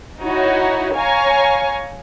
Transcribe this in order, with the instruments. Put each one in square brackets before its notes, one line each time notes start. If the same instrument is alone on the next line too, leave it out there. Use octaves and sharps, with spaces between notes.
[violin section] D#4 E4 F#4 C#5
C#5 F5 G#5 A#5 C#6